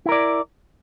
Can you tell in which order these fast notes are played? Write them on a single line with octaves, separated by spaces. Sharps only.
E4 A#4 D5